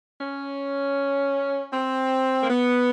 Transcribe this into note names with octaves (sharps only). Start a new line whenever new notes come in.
C#4
C4
A#3
B3